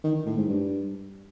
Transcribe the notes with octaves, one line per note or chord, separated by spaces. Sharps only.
D#3
D#3
A2
G#2
G2